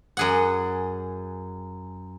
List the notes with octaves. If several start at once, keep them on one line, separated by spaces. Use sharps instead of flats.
F#2 G#4 F#5